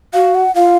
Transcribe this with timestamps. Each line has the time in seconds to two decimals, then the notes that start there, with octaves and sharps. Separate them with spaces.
0.13 F#4 F5
0.35 F#5
0.55 F4 F5